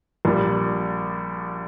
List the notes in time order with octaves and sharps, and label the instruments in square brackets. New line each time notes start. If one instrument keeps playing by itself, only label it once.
[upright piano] A#1 A#2 G3